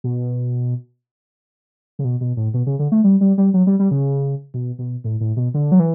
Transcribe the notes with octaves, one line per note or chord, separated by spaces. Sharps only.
B2
C#3
B2
B2
A2
B2
C#3
D3
A3
G3
G3
G3
F#3
G3
G3
C#3
B2
B2
A2
A2
B2
D3
F#3
E3